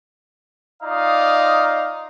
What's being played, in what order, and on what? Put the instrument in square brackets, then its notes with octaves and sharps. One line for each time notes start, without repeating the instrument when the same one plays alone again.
[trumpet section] D#4 F4 D5 F5 A#5 D#6